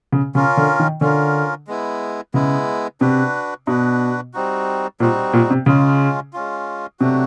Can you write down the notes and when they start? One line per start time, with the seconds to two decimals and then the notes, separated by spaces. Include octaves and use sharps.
0.13 C#3
0.35 C#3 C#4 F4 A#4
0.57 D3
0.79 D#3
1.01 D3 C#4 F4 A#4
1.68 G#3 B3 E4
2.34 C#3 G#3 B3 E4
3.01 C3 D4 F#4 B4
3.67 B2 D4 F#4 B4
4.34 G3 C4 D#4 F#4
5.00 A#2 G3 C4 D#4 F#4
5.33 A#2
5.50 C3
5.66 C#3 G#3 C#4 F4
6.33 G#3 C#4 F4
7.00 C3 F#3 A3 D4 F#4